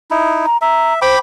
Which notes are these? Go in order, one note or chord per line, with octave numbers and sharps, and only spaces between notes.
D#4 E4
A#5
E5 A#5
C5 G5 B5 D6